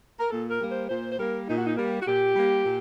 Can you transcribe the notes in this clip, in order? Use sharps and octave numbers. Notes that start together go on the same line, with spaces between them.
A#4
A#2 A4
A#4
G3 A#3
C5
A#2 C5
C5
G3 A#3 A#4
A#2 D#4
F#4
D#4
G3 A#3
F#4
A#2 G4
G3 A#3
A#2